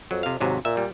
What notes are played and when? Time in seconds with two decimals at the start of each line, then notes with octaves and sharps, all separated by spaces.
0.11 F2 F#3
0.23 C3 F5
0.40 D#2 G#2 C3 F#3
0.65 A#2 E5
0.77 G3